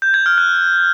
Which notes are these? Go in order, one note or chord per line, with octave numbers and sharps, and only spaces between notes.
G6
G#6
F6
F#6